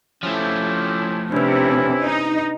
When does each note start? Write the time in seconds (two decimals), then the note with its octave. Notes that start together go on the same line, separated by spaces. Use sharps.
0.23 F3 A3 C#4 E4 G4
1.32 C3 C#4 D4 E4 B4
2.02 D#4